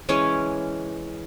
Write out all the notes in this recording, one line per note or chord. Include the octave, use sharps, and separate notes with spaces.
E3 G#3 C#4 C#5